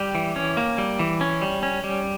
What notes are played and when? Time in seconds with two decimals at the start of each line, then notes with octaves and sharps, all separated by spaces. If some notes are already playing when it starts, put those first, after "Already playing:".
Already playing: G3 G4
0.15 E3
0.36 C#4
0.57 A#3
0.78 G3
0.99 E3
1.21 C#4
1.42 G3
1.63 C#4
1.84 G3